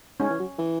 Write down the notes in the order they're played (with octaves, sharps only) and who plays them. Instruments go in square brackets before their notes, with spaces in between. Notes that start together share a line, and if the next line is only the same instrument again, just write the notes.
[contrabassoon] G#2 [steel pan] C#4
[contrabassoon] E3
F#3
E3